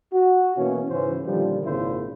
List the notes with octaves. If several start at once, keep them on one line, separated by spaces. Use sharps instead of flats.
F#4
B2 E3 A#3 C#4
G#2 C#3 E3 C#4 C5
A#2 D3 D#3 F3 G3
G#1 A#2 C#3 E4 F4 C5